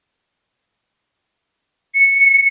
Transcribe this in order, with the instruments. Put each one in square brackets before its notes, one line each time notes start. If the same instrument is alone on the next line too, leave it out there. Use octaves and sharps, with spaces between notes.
[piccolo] C#7